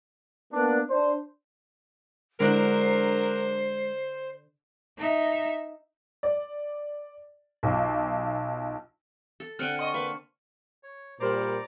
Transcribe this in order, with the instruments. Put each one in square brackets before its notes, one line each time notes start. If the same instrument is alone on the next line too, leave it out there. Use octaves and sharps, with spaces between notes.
[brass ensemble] A#3 B3 D4
D4 C5
[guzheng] D3 [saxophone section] F#3 D4 A#4 [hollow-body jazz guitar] G#3 E4 [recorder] C5
[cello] D#4 E5
[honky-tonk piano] D5
B1 F4
[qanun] A4
[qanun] D3 C4 [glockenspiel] F6 C#7 D#7 [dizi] F#6
[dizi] D#5 [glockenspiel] C6 C#6
[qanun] A#3 [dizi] B4
[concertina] C#5
[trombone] A#2 [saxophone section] G3 A#4 C5 [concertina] D5 A#5 D6